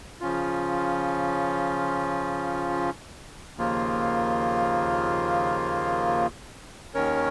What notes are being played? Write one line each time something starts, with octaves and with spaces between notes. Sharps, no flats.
C#3 F3 C#4 F4
D#2 C#3 F3 A#3 F4
D#2 D#3 C#4 A#4 C#5